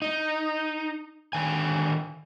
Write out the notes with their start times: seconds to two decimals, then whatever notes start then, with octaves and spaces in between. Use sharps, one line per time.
0.02 D#4
1.33 D3 D#3 G#5